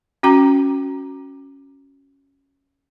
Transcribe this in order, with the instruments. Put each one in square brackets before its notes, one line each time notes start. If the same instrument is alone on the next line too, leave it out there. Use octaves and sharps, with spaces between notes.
[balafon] C#4 F#4 G5 A#5